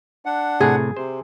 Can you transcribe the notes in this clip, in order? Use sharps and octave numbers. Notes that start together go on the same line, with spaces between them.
D4 F#5
A2 C3 G#4
C3 C5